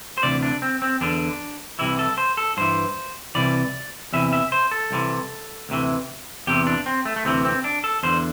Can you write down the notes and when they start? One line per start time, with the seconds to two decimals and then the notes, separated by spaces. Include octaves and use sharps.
0.18 C5
0.23 D2 C3 E3 D5
0.43 D4
0.62 C4
0.82 C4
1.01 E2 D3 D4
1.79 C2 C3 E3 E4
1.99 A4
2.18 C5
2.37 A4
2.57 G2 E3 C5
3.35 C2 C3 E3 D5
4.13 E2 C3 E3 E5
4.33 E5
4.52 C5
4.71 A4
4.91 C2 C3 E3
5.69 D2 C3 E3
6.47 E2 C3 E3 G4
6.67 D4
6.86 C4
7.05 A3
7.16 A3
7.25 D2 C3 E3 C4
7.45 C4
7.64 D4
7.84 A4
8.03 E2 D3 C5